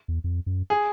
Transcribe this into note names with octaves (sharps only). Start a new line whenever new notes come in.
E2
F2
F#2
G#4